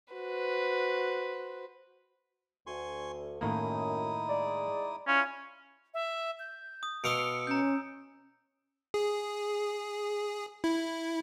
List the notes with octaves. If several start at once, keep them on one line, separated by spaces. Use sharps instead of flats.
F#4 B4 C5
D2 G#5 C6 C#6
F#2 A2 D#3 A#3 D#4 E4 D#6
G#3 D5
C#4 E4 F4 F5
E5
G6
D#6
B2 F5 C6 D#6 E6 C#7 D7
C#4 A#5 G6
G#4
E4